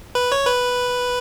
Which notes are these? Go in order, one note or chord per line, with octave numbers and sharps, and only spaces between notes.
B4
C#5
B4